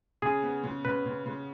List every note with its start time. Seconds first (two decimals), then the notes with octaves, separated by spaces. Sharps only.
0.22 C#3 G#4
0.43 B3
0.63 C#3
0.85 C#3 B4
1.05 C#3
1.26 C#3